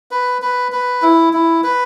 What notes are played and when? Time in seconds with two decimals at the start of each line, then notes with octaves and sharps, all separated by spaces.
0.11 B4
0.42 B4
0.72 B4
1.02 E4
1.33 E4
1.64 B4